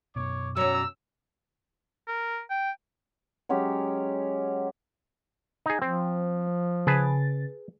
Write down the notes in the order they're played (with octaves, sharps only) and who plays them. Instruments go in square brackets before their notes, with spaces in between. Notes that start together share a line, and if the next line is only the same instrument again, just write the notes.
[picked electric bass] F#2 B2 [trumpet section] C#5 D6
[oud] F#3 C#4 [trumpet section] D5 A#5 [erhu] E6
[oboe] A#4
G5
[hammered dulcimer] F#3 G#3 C#4 G4
[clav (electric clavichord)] D#4 G#4
[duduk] F3 [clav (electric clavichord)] C4
[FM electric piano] C#3 A6 [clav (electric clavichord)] G#4 B4 A5